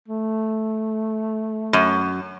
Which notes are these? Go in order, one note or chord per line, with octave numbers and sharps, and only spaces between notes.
A3
F#2